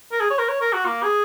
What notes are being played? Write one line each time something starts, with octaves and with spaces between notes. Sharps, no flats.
A#4
G#4
C#5
A#4
C#5
A#4
F#4
A#3
G#4